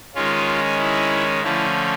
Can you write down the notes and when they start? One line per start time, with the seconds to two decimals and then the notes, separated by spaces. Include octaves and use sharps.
0.15 D#3 G#3 C#4 F4
0.79 E4
1.43 D3 F3 A3 C#4 E4